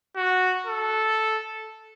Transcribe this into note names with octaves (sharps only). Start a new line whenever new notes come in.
F#4
A4